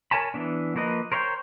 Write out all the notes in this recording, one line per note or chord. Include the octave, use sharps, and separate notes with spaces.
A#4 C#5 G#5 A5 B5
E3 B3 D4
F3 A#3 A#4 B4 D#5
A#4 C5 C#5 E5 G5